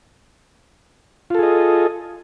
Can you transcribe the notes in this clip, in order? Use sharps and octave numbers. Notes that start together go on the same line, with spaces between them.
F4 G#4 A4 D#5